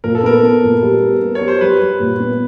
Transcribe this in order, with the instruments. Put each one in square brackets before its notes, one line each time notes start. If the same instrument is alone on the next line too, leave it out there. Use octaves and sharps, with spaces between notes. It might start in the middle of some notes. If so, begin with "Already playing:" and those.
[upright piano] A#2 [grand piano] A#4
[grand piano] A4
[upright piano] B3 [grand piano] A#4
[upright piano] B3
A#2
G3
B3
B3
[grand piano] C#5
[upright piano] G3
[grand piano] C5
[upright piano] G3 [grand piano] B4
[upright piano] G3
A#2
B3